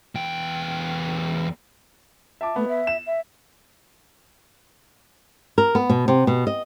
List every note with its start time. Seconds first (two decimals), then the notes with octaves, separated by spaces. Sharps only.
0.15 E2 G5
2.41 E5 A5 D6
2.56 A3 B3
2.68 E5
2.87 E7
3.06 E5
5.58 A#4
5.75 B3
5.90 B2
6.08 C3
6.27 B2
6.47 D#5